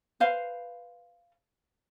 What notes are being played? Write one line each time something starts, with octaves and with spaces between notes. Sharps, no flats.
B4 C5 F5